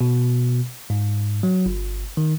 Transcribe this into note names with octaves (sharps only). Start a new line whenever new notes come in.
B2
G#2
F#3
G1
D#3